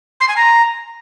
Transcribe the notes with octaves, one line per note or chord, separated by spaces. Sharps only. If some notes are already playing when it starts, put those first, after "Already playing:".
C6
G#5
A#5